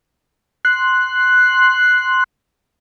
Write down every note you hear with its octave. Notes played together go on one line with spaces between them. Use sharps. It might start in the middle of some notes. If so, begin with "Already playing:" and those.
C6 F#6